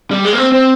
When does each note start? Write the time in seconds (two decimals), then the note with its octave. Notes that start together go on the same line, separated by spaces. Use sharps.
0.11 G3
0.25 G#3
0.33 A#3
0.38 C4
0.52 C4